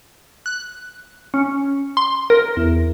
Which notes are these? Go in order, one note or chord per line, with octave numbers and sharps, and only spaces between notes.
F#6
C#4
C6
A#4
E2